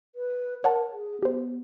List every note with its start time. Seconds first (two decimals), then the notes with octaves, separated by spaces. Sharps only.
0.15 B4
0.64 A#4 C#5 F#5 A5
0.92 G#4
1.23 B3 G4 C5